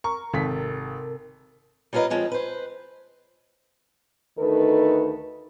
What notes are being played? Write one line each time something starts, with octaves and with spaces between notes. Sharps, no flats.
A#4 C#6
G#1 C3 C4 A4 B6
G3 C#4 F4 A#4 B4 D#5
F3 G#3 C4 C#4
B4 C5
D2 D#3 D#4 A4 B4